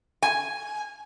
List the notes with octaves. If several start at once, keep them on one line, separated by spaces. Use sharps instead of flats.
G#5